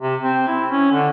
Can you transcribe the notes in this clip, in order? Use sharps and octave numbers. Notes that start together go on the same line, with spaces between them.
C3
C4
E4
C#4
D3